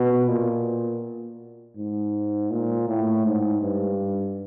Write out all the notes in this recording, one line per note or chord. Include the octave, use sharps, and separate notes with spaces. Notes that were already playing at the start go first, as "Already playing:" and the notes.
Already playing: B2
A#2
G#2
A#2
A2
G#2
G2